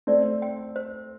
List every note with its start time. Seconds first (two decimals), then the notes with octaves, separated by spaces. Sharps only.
0.07 A3 C4 D5
0.42 G5
0.76 C5